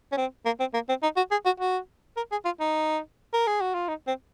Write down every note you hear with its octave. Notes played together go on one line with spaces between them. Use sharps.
C#4
C4
A#3
C4
A#3
C4
D#4
F#4
G#4
F#4
F#4
A#4
G#4
F4
D#4
A#4
G#4
F#4
F4
D#4
C4